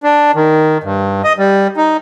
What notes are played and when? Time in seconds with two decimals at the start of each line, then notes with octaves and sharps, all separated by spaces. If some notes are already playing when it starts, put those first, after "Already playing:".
0.03 D4
0.35 D#3
0.84 G2
1.24 D#5
1.38 G3
1.77 D#4